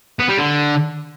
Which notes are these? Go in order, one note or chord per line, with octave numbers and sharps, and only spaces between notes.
B3
G3
D3